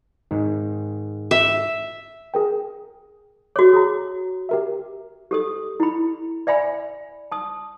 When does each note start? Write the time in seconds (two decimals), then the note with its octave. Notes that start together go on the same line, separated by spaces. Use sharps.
0.31 G#2 D#3
1.31 E5
2.34 G#4 A#4 G5
3.56 F#4 C#5 D6
3.73 G#4 A#5
4.49 G4 A#4 E5
5.31 G4 A4 D#6
5.80 E4 B5
6.47 D5 E5 G#5 B5
7.32 A5 D#6